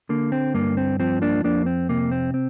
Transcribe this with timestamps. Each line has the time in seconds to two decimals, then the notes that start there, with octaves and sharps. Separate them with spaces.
0.09 D3 A#3
0.32 C4
0.54 G2 A#3
0.77 C4
1.00 F3 C4
1.22 A#3 D4
1.44 F2 A#3 D4
1.66 C4
1.89 C3 A#3
2.12 C4
2.34 C4